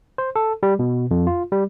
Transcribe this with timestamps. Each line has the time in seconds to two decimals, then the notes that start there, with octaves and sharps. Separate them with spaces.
0.18 C5
0.36 A4
0.63 G3
0.79 B2
1.11 F2
1.27 F4
1.52 G3